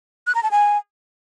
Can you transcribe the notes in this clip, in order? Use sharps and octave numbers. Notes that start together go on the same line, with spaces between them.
F#6
A#5
A5
G#5